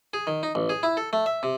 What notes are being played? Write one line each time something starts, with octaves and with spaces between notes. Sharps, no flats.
G#4
D#3
D#4
A1
G#4
E4
A4
A3
E5
C3